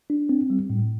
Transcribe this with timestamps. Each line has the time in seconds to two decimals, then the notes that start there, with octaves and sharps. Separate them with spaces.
0.10 D4
0.29 C4
0.50 G3
0.70 A2